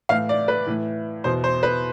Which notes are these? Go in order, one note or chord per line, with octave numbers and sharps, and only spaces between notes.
A2 E3 F5
D5
B4
A2 E3
E2 B2 C5
C5
B4